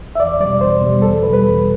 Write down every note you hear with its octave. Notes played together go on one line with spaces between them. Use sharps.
E5
E2 D5
B2 G3 D5
E2 C5
B2 G3
E2 A4
B2 G3 B4
B4
E2